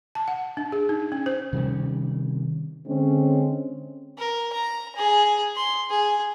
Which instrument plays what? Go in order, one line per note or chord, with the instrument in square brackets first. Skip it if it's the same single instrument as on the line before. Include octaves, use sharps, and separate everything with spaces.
[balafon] A5
F#5
D4
G#4
D#4
C#4
C5
[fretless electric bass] C3 D#3 G3 C#4
[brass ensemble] D3 G#3 C4 C#4
[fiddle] A#4
A#5
G#4
C6
G#4